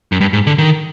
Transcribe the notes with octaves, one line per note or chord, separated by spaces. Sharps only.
F#2
G2
G#2
D3
D#3